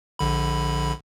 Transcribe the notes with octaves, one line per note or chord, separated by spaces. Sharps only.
A#1 D3 B5